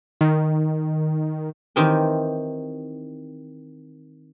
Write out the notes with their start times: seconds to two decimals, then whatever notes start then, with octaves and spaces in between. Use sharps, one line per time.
0.21 D#3
1.76 D#3 E3 C4 G4 A#4